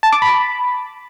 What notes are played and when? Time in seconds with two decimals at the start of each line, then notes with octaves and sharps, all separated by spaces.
0.03 A5
0.12 D6
0.22 B5